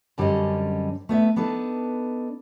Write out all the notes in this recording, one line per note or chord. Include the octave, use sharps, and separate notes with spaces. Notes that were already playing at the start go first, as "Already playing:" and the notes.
F#2 D3 G3 C4 C#4 D#5
A3 B3 D#5 E5
B3 D4 D#4 A4 B4